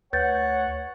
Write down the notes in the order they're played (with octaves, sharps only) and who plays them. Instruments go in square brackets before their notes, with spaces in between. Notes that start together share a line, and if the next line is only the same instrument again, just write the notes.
[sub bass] D2 [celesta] B4 G6 A6 [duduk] C#5 [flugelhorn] F#5